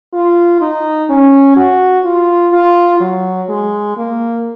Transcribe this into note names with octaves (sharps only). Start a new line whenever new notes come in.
F4
D#4
C#4
F#4
F4
F4
F#3
G#3
A#3